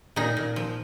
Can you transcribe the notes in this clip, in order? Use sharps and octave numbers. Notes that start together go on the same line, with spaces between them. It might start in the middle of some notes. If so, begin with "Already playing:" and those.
A#2 D#4
A#2
F3